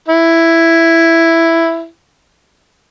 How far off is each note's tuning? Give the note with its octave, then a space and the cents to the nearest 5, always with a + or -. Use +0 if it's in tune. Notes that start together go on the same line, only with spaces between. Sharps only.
E4 +5